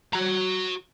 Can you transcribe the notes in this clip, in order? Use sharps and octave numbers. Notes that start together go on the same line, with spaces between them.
F#4 A#5